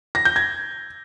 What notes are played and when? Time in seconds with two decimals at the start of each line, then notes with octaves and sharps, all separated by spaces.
0.15 A#6
0.25 G6
0.36 G#6